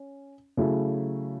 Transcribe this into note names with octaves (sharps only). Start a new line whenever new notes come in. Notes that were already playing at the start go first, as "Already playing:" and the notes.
Already playing: C#4
C#3 F#3 A3 E4